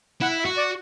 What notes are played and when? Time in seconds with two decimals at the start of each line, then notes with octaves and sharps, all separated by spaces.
0.21 E4 F#5
0.39 E5
0.45 F#4
0.57 D5